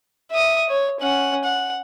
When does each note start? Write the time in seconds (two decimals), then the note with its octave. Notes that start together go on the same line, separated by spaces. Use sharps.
0.31 E5 D#6
0.70 C#5
1.00 C#4 F#5
1.44 F#5